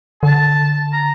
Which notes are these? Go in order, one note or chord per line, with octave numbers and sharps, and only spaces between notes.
D3 A5
A#5